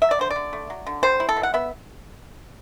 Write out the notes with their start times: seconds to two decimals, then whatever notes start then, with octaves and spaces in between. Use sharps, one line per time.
0.02 F#3 E5
0.11 D5
0.19 D3 C5
0.31 D5
0.36 D3
0.53 A3
0.70 F#3
0.87 D3
1.03 G3 C5
1.20 E4
1.29 A4
1.37 B2
1.43 F#5
1.54 B3 E5